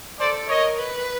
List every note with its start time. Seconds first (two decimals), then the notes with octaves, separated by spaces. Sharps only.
0.20 A4 C5 D5
0.48 A#4 C#5 D#5
0.78 B4